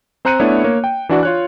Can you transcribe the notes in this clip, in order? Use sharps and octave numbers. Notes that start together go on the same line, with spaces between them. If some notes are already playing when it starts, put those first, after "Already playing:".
C4 C5 A#5 F#6 C#7 D#7
A3 B3 D4 E4 C#5
A#3 C#5
G5
E3 D4 F#4 D5
F4 C#5 F#6